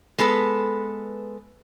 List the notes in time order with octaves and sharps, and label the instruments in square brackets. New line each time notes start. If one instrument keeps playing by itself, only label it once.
[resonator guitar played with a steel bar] G#3 B3 A4 B4